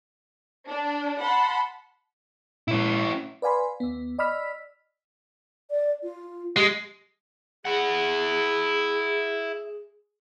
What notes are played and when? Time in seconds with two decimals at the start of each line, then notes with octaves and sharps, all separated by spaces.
0.69 D4
1.21 F#5 A5 B5 C6
2.68 A#2 G#3 C#4 E4
3.42 B4 D5 F5 G#5 B5 C6
3.80 D#2 B3
4.19 D5 D#5 B5 E6 F6 B6
5.70 D5
6.03 F4
6.56 G#3 G4
7.65 E4 G#4 F#5